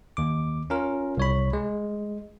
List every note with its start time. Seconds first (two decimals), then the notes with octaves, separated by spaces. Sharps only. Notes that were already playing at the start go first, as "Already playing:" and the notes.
0.17 D#2 D6
0.70 C#4 F4 A#4
1.17 C2 C#5 B5
1.53 G#3